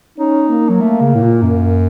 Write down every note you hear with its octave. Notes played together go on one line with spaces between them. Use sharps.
C#4 D#4
A#3
F#3
A3
C#3
A2
A#2
F#2